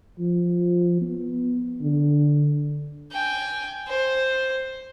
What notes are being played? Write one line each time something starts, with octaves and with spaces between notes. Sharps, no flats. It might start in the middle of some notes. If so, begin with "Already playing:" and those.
F3
B3
D3
G5 G#5
C5